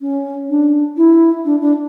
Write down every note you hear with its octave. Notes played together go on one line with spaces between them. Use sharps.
C#4
D4
E4
D4
D4